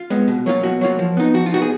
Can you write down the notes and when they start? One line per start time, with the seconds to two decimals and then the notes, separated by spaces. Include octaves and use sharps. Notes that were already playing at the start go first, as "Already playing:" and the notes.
Already playing: F4
0.10 G#3 B3
0.28 B2
0.46 F#3 A#3 F4
0.63 B2 F#4
0.81 F#3 A#3 F4
0.99 F3
1.17 B3 D#4
1.34 F3 F#4
1.46 F4
1.52 B3 D#4 F#4
1.62 G#4